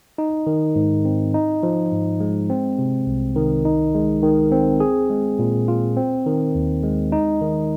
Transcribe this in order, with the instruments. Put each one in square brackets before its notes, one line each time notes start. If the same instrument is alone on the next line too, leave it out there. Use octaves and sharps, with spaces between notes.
[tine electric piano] D#4
D#3
G#2
C4
D#4
F3
G#2
G#3
C4
C3
C2
D#3
D#4
G#3
D#3
C4
G#4
G#3
A#2
F4
C4
D#3
D#2
G#3
D#4
D#3